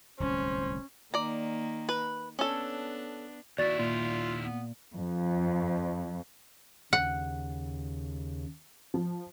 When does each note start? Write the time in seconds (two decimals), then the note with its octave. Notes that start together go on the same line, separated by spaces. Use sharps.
0.20 D1 C2 C#4 C5
1.14 D#3 A#3 D5 A#5
1.89 B4
2.39 B3 C#4 D4 A4
3.58 D#2 E4 F#4 D5 A6
3.79 A#2 F4
4.44 B3
4.95 F2
6.93 D#2 C#3 F#5
8.94 F3